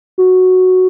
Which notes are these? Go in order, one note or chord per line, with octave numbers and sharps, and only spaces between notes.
F#4